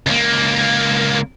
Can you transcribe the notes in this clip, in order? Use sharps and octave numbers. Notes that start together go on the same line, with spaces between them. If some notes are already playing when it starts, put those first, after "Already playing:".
C#2 A#3